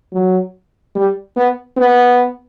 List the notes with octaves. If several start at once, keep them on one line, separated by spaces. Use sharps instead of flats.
F#3
G3
B3
B3